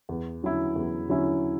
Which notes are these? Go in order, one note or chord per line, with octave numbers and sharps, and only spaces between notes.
E2
D3 F#3 C#4 E4
E2
D3 F#3 C#4 E4